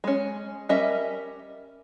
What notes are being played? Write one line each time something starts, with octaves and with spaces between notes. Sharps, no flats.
G#3 C#4
G3 C#4 A#4 D#5 E5